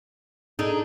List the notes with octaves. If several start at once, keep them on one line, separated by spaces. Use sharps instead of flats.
D4 D#4 G#4 A4